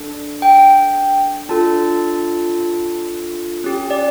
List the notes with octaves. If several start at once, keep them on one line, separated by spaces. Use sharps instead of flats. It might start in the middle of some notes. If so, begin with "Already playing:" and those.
Already playing: D4 A4
G5
D4 F4 A4 A5
C#4 G4
D5